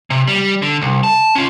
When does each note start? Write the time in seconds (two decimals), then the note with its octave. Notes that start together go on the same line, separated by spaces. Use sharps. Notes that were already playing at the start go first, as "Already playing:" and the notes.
0.10 C3
0.28 G3
0.62 D3
0.81 C2
1.03 A5
1.35 C#4 F4